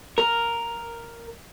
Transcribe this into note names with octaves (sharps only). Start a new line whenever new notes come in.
A#4